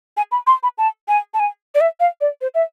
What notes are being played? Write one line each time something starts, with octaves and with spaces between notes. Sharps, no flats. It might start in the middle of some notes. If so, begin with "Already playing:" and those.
G#5
B5
C6
B5
A5
G#5
A5
G#5
D5
E5
F5
D5
C5
E5